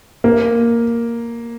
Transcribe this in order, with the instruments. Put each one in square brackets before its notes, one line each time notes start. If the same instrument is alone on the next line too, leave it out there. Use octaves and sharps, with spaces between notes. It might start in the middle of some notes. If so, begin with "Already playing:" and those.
[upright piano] A#3